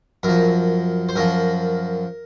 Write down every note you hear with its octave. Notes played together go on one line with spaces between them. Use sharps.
F#2 F3 A#4
C5
F#2 F3 A#4